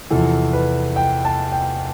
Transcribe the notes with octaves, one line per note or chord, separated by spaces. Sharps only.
E2 C3 F3 A4
B4
G5
A5
G5